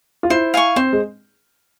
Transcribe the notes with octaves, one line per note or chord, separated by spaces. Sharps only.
F4
E4 C5
F5 G#5 C#6
C4 C5
G#3